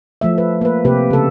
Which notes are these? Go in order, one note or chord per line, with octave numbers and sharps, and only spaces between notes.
F3 A3 E5
B4
A#3 B4
C3 A#3 G4 B4
C#3 A4